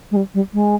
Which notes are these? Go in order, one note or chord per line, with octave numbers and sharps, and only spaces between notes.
G#3
G3
G3
G#3